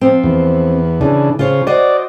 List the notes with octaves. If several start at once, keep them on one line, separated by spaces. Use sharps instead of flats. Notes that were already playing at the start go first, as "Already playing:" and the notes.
F3 C4
E2
C#3 E3 D4
C#3 F4 C5 C#5
F#4 C5 D5 D#5